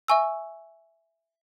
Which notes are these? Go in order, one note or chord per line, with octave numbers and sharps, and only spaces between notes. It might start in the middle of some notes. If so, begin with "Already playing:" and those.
E5 G#5 C#6 E6